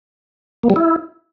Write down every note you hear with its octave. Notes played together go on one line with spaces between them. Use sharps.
A#3
G3
E4